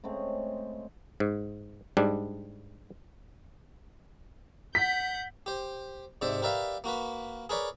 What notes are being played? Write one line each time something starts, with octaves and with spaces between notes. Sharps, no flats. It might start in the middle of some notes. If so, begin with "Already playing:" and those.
C#3 G#3 A3 C4
G#2
G#2 G3 D4
F#5 G6 B6
G4 C5
G#2 C3 C5 D5 E5
G4 A#4 B4 D5 E5 F5
A#3 F#4 A#4 B4
G#4 A#4 B4 C#5 D5